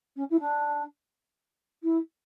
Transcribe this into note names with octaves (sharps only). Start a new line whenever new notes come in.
C#4
E4
D4
E4